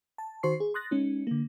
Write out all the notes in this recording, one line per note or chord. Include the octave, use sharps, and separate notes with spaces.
A5
D#3 F#4 C5 C6 C#6 C7
G#4
C6 D#6 F#6 A6 A#6
G#3 C#4 D#4
D3 A#3